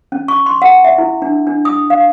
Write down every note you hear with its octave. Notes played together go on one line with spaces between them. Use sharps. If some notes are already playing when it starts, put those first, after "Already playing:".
C#4
C#6
C6
F#5
E5
E4
D4
D4
D#6
F5